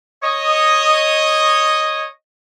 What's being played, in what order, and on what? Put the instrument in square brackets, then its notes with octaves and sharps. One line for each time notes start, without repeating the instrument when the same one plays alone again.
[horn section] C#5 D#5